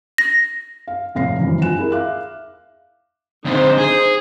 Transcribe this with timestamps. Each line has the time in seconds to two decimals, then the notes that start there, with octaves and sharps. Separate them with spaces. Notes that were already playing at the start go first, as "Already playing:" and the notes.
0.18 A#6
0.87 F5
1.15 F1 A2 F5 A#6 C7
1.40 G#1 F#2 D3 E3
1.62 F4 G#5 F#6 E7
1.78 E4 G#4 A#4
1.92 E5 F5 D6 F#6
3.46 D3 C4 D#4 C5
3.78 G#4